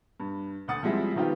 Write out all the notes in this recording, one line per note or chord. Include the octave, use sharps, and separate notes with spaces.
G2
D2 D3 F#5 D#6 A6
F3 G3 G#3 C4 E4
D#3 F3 B3 D#4 F4 G4